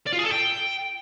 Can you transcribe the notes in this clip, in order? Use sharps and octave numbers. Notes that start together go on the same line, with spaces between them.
D5
F4
G#4
A4
G5